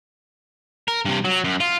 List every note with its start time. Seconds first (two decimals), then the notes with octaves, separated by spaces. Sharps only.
0.88 A#4
1.05 G2 C3
1.25 F#3
1.44 F#2
1.61 F4